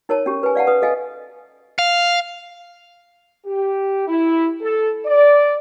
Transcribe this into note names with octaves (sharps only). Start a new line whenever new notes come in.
D#4 A#4 C#5 A5
C#4 G4
B4 G#5
D5 F5 F#5 A5
B4 D#6
A4 D#5 F5 G#5
F5
G4
E4
A4
D5